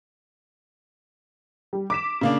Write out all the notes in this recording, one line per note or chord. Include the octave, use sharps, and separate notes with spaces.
G3
D6 B6 E7
C#3 A#3 D4